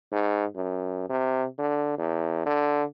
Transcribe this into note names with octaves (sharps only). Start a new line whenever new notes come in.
G#2
F#2
C3
D3
E2
D3